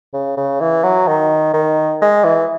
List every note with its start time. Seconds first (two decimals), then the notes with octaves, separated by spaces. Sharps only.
0.13 C#3
0.37 C#3
0.61 E3
0.84 F#3
1.08 D#3
1.53 D#3
2.02 G#3
2.24 E3